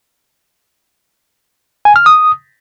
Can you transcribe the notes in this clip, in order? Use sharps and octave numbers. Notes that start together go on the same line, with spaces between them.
G#5
F6
D#6